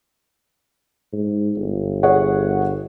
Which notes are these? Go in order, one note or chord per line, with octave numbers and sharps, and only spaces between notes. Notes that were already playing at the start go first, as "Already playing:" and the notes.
G#2
G1
G#4 C#5 F#5